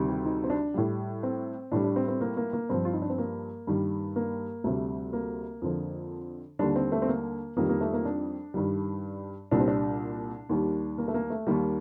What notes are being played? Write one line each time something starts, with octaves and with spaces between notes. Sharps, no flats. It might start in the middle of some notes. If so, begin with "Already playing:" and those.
Already playing: D2 C3 D#3 G3
G4
D#4
C4
D4
A2 G3
C4
A2 G3 D4
D4
C4
C4
A#3
A#3
A#3
G2 F3 C4
F4
D#4
D4
C4
A#3
G2 D#3 G3
A#3
D2 C3 G3 A3
A#3
F2 D3 F3
D#2 D3 G3 D4
C4
A3
C4
A#3
F2 D#3 G3 A#3
A#3
A3
A#3
D4
G2 D#3 G3
C2 A#2 G3 D4
C4
D4
D#2 D#3 G3
A#3
A3
A#3
A3
D#2 D#3 G3 A#3